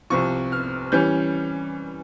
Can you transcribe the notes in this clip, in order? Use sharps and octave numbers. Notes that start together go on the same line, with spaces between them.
C2 C3 F3 C#6
F6
E3 G3 C#4 G6